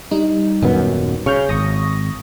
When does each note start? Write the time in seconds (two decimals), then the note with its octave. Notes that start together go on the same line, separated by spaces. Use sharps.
0.11 G3 D#4
0.62 D#1 F#2 B3
1.26 C#3 C#6 F6 G6
1.49 G#1 C#6 D#6 A#6